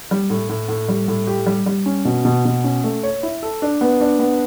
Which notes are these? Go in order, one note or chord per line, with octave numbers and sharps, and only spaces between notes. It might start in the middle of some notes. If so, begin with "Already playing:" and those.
G3
A2
A2
A2
G3
A2
G4
G3
G3
C#4
B2
B2
B2
C#4
A3
C#5
E4
A4
D4
B3
D4
B3